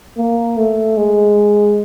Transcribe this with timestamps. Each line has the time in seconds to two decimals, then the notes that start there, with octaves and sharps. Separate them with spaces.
0.17 A#3
0.57 A3
0.97 G#3